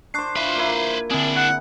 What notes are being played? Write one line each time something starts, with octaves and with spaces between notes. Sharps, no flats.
D4 C5 C#6 F#6 C7
E4 F4 B4 C5 F5
A#3 E4
D3 C4 D4 E4 G#4
F#5